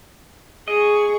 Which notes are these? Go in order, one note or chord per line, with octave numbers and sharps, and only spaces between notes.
G#4 D#5 C#6